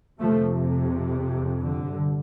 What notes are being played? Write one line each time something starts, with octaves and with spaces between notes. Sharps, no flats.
F2 C3 F3 A3
D3
G2